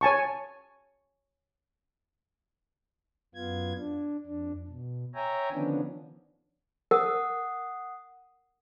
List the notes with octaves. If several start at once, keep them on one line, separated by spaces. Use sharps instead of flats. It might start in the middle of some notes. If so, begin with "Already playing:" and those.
C#5 G#5 A5 C#6
F#2 B3 F4 G#6
D4
F2 D4
B2
C#5 E5 G5 G#5 A#5
D3 D#3 F3 B3 C#4 D4
A#4 F#5 D#6